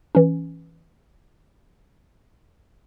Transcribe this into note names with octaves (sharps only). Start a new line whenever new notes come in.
E3 C#4